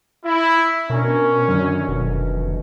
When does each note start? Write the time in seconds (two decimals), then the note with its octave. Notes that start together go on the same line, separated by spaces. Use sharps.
0.25 E4 A#6
0.90 B2 C#4 D4 A#4
1.48 F#2 D3 D#3 F#3
1.88 F1 B2